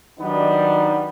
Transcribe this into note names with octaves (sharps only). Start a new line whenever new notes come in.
D#3 F#3 G3 B3 D4 D#4